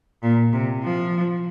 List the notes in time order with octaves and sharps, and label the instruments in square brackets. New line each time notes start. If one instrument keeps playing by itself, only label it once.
[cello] A#2
C3
F3